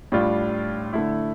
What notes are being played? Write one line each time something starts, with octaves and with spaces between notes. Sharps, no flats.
A2 G3 D4 F4
D3 A3 E4